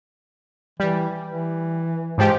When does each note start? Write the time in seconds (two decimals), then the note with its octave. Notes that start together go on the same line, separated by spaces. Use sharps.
0.80 E3 G3
1.26 E3
2.18 G#2 F3 G#3 G4